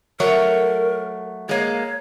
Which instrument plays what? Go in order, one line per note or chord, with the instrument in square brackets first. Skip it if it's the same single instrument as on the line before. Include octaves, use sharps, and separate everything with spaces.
[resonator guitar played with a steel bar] F#3 A3 C#5 [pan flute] A#4
[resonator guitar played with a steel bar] G#3 A#3 [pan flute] C#5